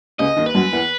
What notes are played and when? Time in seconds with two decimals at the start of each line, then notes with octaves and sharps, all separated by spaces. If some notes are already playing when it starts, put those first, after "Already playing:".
0.19 C#2 C#3 D#5
0.36 D#2 D#3
0.46 B4
0.54 F#2 F#3
0.72 E2 E3